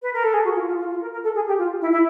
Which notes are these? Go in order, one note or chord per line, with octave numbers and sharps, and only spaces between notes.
B4
A#4
A4
G#4
F#4
F4
F4
F4
F4
A#4
A#4
A4
G#4
G4
F4
E4
E4